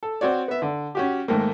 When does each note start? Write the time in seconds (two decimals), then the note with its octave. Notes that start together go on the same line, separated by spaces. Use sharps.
0.03 A4
0.21 C4 F#4 C#5 D5
0.48 B3 E5
0.62 D3
0.95 C#4 F#4 G4
1.28 G#2 D#3 A3 A#3